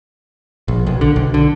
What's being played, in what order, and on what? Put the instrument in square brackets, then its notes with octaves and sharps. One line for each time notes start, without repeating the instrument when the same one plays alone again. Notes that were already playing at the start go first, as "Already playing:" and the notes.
[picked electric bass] A#1
B1
D3
B1
D3